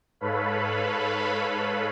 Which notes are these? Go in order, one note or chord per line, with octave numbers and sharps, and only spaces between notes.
G#2 A4 B4 C#5 F5 B5